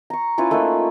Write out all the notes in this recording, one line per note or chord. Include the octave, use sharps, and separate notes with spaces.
A#5 C#6
C#4 E4 F4 B4
A3 A#3 D#4 B4